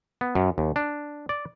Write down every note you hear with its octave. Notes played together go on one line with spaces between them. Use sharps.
B3
F#2
D#2
D4
D5